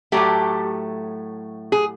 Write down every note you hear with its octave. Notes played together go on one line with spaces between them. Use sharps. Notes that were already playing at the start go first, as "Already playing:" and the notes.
A2 F#3 A3 G4
G#4